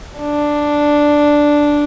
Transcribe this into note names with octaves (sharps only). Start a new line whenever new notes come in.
D4